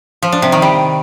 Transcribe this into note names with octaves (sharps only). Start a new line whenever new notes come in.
F3
D4
C3
D#3
G3